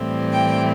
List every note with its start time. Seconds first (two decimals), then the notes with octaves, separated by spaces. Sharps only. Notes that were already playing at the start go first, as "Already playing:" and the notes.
Already playing: A2 E3 G3 C4
0.33 G5